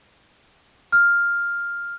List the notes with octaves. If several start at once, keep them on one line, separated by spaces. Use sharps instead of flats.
F6